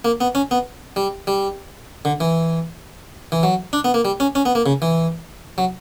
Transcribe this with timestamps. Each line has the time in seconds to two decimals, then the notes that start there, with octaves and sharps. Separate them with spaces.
0.05 A#3
0.21 B3
0.35 C#4
0.51 B3
0.96 G3
1.27 G3
2.05 D3
2.20 E3
3.32 E3
3.43 F#3
3.73 D4
3.85 B3
3.94 A#3
4.05 G3
4.20 C#4
4.35 C#4
4.46 B3
4.55 A#3
4.66 C#3
4.82 E3
5.58 F#3